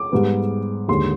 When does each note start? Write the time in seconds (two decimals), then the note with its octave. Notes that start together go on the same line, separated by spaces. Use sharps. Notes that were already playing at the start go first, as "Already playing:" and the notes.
Already playing: D6
0.12 G#2 G3 B3
0.88 D#2 D3 G#3 C6